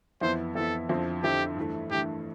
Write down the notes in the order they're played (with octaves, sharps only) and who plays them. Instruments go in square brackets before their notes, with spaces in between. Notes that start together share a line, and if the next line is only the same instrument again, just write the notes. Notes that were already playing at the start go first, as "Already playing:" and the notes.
[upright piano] F2 E3 B3 E4 [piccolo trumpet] C5
[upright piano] F2 E3 B3 E4 [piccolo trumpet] A4
[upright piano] F2 D3 F3 C4 E4
[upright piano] F2 D3 F3 C4 E4 [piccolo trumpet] G4
[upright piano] G2 E3 A3
[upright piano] G2 E3 A3 [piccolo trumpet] G4